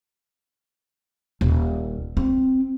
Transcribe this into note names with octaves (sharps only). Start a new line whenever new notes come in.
D#1
C4